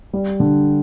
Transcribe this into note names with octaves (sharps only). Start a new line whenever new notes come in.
G3
D3